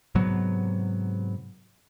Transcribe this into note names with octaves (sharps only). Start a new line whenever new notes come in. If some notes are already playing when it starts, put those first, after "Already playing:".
G#2 C3 F#3 B3